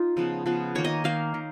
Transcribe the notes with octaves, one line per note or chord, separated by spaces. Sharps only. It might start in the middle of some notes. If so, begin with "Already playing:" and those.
Already playing: D#4 F4
C#3 F3 B3
C#3 F3 B3
D#3 A#3 C#5
D#5
D#3 A#3 F5
D#3